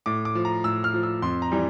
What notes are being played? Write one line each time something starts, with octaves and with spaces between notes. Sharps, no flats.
A2 D6
D6
F3
A#5
A2 E6
F6
F3
E6
F2 C6
A#5
E3 G3